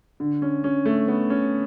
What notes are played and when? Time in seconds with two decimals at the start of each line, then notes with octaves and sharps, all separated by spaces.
0.20 D3
0.42 C#4
0.64 C#4
0.85 A3
1.08 B3
1.30 C#4